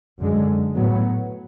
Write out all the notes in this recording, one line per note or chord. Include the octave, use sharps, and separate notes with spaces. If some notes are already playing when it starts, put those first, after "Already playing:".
F#2 D3 G#3
A2 F#3 B3